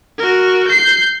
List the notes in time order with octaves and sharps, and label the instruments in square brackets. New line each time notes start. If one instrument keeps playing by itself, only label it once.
[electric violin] F#4 A#4
G6 C7